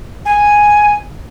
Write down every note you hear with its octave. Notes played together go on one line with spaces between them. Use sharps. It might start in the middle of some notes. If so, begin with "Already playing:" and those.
G#5